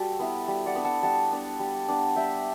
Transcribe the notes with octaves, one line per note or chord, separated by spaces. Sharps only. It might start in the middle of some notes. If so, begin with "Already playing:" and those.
Already playing: G3 F#4 A4
B3 E4
G3
D5 F#5
B3 D4
F#5 A5
G3 F#5 A5
B3 D4
G3
B3 D4
G3 E5 G5